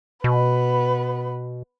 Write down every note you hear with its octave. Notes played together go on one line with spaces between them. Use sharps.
B2 B3 B4